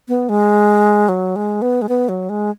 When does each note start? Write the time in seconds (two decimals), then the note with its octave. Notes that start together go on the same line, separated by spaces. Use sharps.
0.08 B3
0.29 G#3
1.09 F#3
1.36 G#3
1.62 B3
1.82 G#3
1.89 B3
2.09 F#3
2.29 G#3